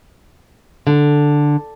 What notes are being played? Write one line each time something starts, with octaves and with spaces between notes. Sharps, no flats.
D3